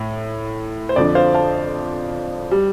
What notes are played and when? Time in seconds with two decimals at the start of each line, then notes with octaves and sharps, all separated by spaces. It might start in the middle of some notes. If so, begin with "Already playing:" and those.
Already playing: A2
0.89 C5
0.96 F2 D3 F3 D5
1.15 C5 F5
1.34 F5 A5
2.51 G3